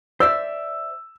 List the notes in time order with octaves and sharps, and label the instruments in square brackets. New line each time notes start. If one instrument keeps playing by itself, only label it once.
[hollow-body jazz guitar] C5 D5 E5 [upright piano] E6